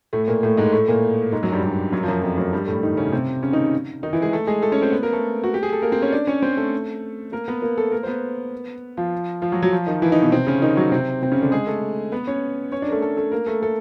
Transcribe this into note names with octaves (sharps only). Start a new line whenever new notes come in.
A2 A3
A#2 A#3
A2 A3
G#2 G#3
A2 A3
A#2 A#3
G#2 G#3
F#2 F#3
G2 G3
G2 G3
F#2 F#3
F3
F#2 F#3
F2 F3
F#2 F#3
G2 G3
A2 A3
D#3 D#4
C#3 C#4
C3 C4
C#3 C#4
D#3 D#4
D#3 D#4
E3 E4
G#3 G#4
A3 A4
G#3 G#4
A3 A4
C#4 C#5
C4 C5
B3 B4
A#3 A#4
A3 A4
F#4
G4
G#4
A4
A#3 A#4
C4 C5
C#4 C#5
D4 D5
C#4 C#5
C4 C5
A3 A4
A#3 A#4
B3 B4
A#3 A#4
A3 A4
A#3 A#4
C5
B3 B4
F3 F4
F3 F4
F#3 F#4
F#3 F#4
F3 F4
D#3 D#4
E3 E4
D#3 D#4
B2 B3
C3 C4
C#3 C#4
D#3 D#4
F#3 F#4
C3 C4
C3 C4
C#3 C#4
D3 D4
G#3 G#4
A3 A4
B3 B4
C#4 C#5
C#4 C#5
D4 D5
A#4
A3 A4
A3 A4
A3 A4
A#3 A#4
A3 A4
A3 A4